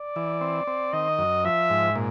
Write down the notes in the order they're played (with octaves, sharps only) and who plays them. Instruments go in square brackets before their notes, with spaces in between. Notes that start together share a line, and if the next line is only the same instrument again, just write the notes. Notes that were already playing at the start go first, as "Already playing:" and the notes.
Already playing: [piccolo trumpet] D5
[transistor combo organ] E3
C4
C4
[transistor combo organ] D#3 [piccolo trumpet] D#5
[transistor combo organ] F#2
[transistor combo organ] F3 [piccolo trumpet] E5
[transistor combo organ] G#2
A#2